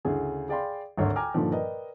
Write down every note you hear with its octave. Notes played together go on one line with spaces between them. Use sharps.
D2 C#3 E4 G#4 G#5
G#4 D5 F5 G5 B5 C6
G#1 D2 C#5
G5 G#5 A#5 D6 F6
G2 A#2 D3 D#3 F3
A#4 B4 D5 D#5 G5